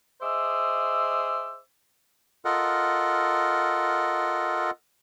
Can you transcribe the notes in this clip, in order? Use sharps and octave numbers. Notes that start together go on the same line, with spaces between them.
G#4 C5 D#5 E5 D6 E6
F4 A4 A#4 D#5 F#5